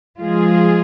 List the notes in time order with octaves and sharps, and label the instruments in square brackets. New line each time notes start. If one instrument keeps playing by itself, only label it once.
[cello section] F3 G#3 F4 G#4